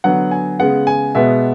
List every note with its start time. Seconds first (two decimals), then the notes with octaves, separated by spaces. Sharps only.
0.04 D3 F#3 B3 F#5
0.31 G#5
0.59 C#3 G#3 B3 F#5
0.87 G#5
1.15 B2 G#3 B3 E5